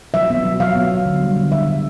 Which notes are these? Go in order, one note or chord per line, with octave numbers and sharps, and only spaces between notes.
F#3 E5
B3
F#3
F#3 F5
B3
B3
D3
G3
D3
D3 E5
D3